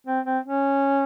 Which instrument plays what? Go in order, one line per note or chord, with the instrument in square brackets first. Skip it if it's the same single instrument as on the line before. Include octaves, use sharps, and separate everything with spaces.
[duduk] C4
C4
C#4